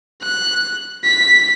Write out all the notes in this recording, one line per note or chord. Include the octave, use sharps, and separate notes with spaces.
F#6
B6